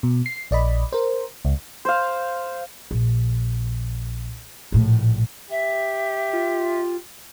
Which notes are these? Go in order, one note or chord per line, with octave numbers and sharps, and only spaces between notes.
B2
C7
A#1 D5 D#5 B5
A#4 C5
C#2
C5 F5
A#1
A#1 A2
G4 E5
F4